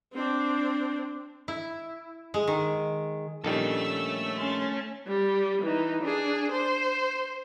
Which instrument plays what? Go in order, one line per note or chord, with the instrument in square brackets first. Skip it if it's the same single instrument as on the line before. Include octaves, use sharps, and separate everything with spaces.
[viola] C4 D4
[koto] E4
G#3
D#3
[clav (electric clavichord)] A#1 D#3 G3 [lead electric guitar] A3 A4 [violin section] C#4 E6
[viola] C#4 [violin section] C6 A6
[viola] G3
E3 D#4
D4 G#4
C5